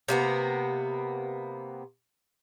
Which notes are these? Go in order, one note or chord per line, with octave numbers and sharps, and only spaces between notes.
C3 A#3 B3